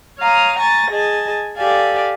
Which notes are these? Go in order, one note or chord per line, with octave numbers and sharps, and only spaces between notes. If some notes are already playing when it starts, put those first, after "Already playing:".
C#5 F5 A#5 D#6 F6
G#5 A#5 C#6 A6 A#6
G#4 D#5 G#5 A5
G4 A4 D5 F5 G#5